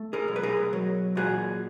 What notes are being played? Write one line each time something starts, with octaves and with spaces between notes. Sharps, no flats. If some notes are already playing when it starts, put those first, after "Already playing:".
Already playing: A3
G#4 A#4
B1
B4
G#4 A#4
F#3
A#2 F#4 G#4